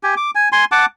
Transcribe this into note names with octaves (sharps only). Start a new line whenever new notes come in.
G4 G#5
D6
G#5
G#5 C6
F#5 A5 D6